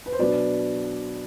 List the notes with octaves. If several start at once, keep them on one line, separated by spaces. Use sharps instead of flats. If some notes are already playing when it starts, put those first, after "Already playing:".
B4
C5
B2 F#3 B3 D4 B4 D5